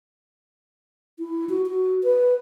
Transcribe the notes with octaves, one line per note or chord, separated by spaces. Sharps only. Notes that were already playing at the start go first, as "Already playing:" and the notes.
E4
F#4
F#4
B4